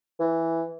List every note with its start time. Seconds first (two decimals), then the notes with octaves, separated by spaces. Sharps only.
0.20 E3